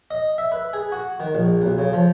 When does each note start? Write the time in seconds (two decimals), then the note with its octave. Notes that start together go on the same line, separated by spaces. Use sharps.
0.11 D#5
0.38 E5
0.52 B4
0.73 G#4
0.92 F#4
1.20 D#3
1.35 A#1
1.62 B1
1.78 C#3
1.93 F3